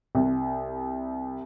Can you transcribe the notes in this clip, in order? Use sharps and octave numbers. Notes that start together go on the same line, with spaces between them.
C2